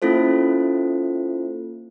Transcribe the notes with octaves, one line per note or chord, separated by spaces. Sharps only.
A#3 C#4 E4 F4 A4 C5